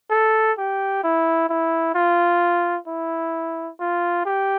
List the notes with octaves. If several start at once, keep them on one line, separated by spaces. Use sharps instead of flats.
A4
G4
E4
E4
F4
E4
F4
G4